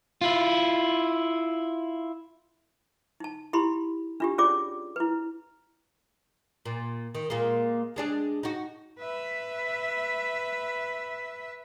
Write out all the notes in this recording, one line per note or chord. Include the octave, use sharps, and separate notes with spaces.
E4 F4
D#4 A5
E4 G4 B5 C6
D4 F4 G4
C#4 F4 G#4 C#5 D5 D6
E4 B4
A#2
D#3
A#2 G#3 A#3
G#3 D4 G#4
D#4 F#4
B4 E5